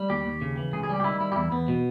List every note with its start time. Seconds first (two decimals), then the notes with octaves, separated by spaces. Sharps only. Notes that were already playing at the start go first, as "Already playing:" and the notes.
Already playing: G3
0.10 D#2 G4
0.25 D#2
0.41 C#3
0.57 E3
0.73 C#2 G#4
0.83 G#4
0.89 G3 G4
1.00 G4
1.04 D#3 E4
1.20 G3 E4
1.32 G4
1.36 E2 E4
1.51 E2 B3
1.68 B2